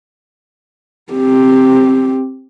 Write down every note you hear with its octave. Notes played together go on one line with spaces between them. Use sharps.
C4 G4